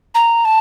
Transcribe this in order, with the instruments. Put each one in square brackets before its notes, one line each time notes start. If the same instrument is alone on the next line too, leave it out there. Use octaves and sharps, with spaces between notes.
[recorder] A#5
A5